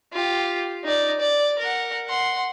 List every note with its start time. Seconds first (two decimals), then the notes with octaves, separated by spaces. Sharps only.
0.13 F4 G4
0.84 D#4 D5
1.19 D5
1.59 A#4 F#5
2.07 F#5 C6